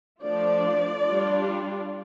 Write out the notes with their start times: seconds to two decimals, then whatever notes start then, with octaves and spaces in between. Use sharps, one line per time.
0.22 F3 A3 D4 F4 D5
1.07 G3 D4 F4